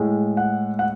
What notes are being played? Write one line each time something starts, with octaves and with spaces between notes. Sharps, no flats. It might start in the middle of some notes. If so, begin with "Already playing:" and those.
Already playing: A2 G#3
F#5
F#5